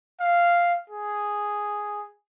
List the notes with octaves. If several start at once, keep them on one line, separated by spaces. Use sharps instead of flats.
F5
G#4